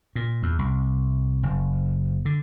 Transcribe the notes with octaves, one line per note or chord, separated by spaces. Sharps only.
A#2
E2
C2
F#1
D3